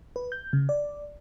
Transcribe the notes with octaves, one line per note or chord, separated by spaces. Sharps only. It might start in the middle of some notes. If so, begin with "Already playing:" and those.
B4
G6
C#3
D5